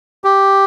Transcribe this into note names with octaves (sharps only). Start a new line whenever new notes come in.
G4